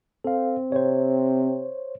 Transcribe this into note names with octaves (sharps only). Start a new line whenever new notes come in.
C4 A4 F5
C3 C5 C#5